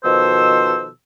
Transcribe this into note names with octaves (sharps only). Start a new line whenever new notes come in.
B2 D#3 F3 A4 C5 E6